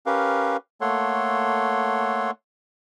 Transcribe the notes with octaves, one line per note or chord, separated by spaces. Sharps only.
C#4 G4 A#4 B4 F5
A3 A#3 A4 C#5 F#5 C6